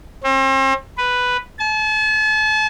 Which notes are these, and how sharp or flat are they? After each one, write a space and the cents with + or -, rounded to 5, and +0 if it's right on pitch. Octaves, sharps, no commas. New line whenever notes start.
C4 +40
B4 +0
A5 -40